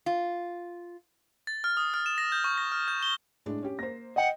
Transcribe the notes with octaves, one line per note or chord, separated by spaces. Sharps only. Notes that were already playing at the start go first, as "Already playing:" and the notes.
F4
A6
F6
D#6
F6
E7
A#6
G6
C#6
A#6
F6
G6
G7
A2 G#3 D4
C#4 G4
A#3 C5 A#6
D#5 F#5 G5